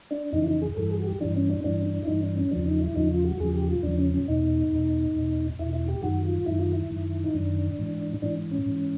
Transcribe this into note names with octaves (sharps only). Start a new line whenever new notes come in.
D4
F2 C#3 E3 D#4
E4
D#4
G#4
G2 E3 A4
G#4
F#4
G4
G2 E3 D4
C#4
D4
G2 E3 D4
D4
E4
G2 E3 D#4
D4
C#4
E2 C#3 F3 D4
D#4
E4
E2 C#3 F3 D#4
F4
F#4
E2 C#3 F3 G#4
G4
F4
E2 C#3 F3 D4
C#4
C#4
E2 B2 D#4
E2 B2
E2 B2
E2 B2 E4
E4
G4
F#2 D#3 F#4
F4
F#2 D#3 E4
F4
E4
F#2 D#3
D#4
F#2 D#3 D4
G#2 E3
G#2 E3 D4
C#4
G#2 E3